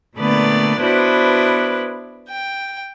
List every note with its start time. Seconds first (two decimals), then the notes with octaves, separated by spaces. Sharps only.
0.17 A#2 D3 A3 B3 B4 D5
0.81 B3 D4 E4 F#4 B4 C5
2.29 G5